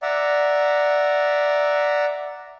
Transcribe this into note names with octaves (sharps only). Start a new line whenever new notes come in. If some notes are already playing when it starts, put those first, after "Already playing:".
D5 E5 F#5 A#5